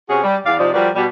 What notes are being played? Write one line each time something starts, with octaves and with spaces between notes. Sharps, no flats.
C3 C#4 F#4 G#4
G3
E2 D5 F5
C3 F3 D#4 C5 D5
F3 G3 F#4 A#4 B4 D5
B2 G3